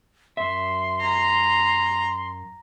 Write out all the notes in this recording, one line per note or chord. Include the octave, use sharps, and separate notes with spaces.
F#2 E5 C6
A#5